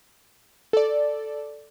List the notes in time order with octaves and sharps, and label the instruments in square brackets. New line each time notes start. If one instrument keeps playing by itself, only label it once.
[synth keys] A4 D5